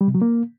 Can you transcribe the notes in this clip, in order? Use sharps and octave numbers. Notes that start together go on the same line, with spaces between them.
G3
C3
F#3
A#3